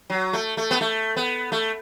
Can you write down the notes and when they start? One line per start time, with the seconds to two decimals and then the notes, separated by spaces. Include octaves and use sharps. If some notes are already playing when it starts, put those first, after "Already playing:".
0.10 F#3
0.33 A3
0.57 A3
0.71 B3
0.81 A3
1.16 B3
1.52 A3